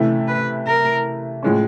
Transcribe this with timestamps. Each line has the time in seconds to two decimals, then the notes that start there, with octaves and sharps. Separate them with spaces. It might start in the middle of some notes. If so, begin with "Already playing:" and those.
Already playing: C3 E3 A3 C#4 E4
0.28 B4
0.67 A#4
1.43 A2 F3 G#3 C#4